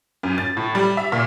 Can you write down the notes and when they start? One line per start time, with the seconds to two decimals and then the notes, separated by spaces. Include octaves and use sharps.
0.23 F#2
0.38 A6
0.57 A2
0.75 G3
0.97 E5
1.12 A#2